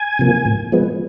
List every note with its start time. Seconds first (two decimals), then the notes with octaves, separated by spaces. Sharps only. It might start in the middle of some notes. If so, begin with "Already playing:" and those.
Already playing: G#5
0.19 C3 F3 A#3
0.45 A2
0.72 F3 G#3 B3